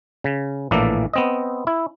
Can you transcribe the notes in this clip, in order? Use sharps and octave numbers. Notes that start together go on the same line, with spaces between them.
C#3
A#1 A2 E3 A#3 A4 D5
B3 C4 D#5
E4